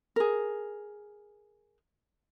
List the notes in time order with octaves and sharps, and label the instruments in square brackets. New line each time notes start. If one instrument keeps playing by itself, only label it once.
[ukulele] G#4 A#4